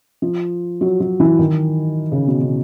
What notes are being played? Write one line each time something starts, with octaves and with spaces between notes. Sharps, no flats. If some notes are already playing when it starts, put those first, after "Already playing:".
F3
F#3
F#3
E3
D#3
C#3
B2
B2